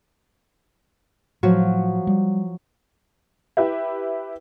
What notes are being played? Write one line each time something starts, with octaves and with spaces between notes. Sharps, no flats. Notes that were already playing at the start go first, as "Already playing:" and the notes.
A2 F3 F#3 F#4
G3
E4 G4 B4 E5